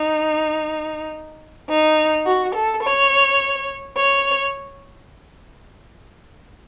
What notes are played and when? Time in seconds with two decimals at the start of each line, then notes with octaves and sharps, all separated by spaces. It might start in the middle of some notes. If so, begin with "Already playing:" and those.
Already playing: D#4
1.70 D#4
2.26 F#4
2.54 A4
2.82 C#5
3.96 C#5